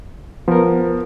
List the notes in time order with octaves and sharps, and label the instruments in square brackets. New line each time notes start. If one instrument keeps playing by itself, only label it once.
[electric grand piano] F3 [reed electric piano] B3 A#4